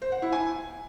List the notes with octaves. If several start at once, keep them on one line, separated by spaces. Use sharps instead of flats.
C5
F#5
E4
G#5